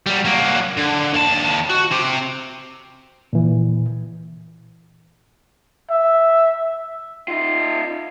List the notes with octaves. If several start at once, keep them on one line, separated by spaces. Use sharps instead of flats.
F#3 G3
F#3 A#3
D3
D#2 A5
F#4
C4 G4
A#2 E3
E5
D#4 F4